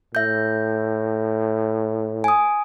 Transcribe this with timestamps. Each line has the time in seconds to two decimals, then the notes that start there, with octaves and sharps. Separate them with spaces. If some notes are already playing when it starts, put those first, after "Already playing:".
0.15 A2 E5 G6
2.24 G#5 D#6